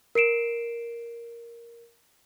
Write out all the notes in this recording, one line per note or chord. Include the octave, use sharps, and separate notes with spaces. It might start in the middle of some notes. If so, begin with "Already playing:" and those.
A#4 C7 D7 E7